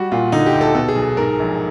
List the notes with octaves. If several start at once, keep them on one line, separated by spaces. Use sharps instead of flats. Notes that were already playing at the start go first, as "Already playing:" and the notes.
Already playing: G3 F#4
A#2 F4
D3 D#4
G4
D2
A4
B2 A4
G#4
B1
G#2 A#4
A#1